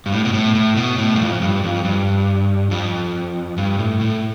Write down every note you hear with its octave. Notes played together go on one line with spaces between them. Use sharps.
G2
A2
B2
A2
A2
B2
A2
G2
F2
G2
F2
G2
F2
G2
A2
A2